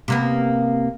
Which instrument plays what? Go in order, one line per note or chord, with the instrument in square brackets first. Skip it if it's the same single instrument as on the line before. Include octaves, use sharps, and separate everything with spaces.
[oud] C3 A#3 B3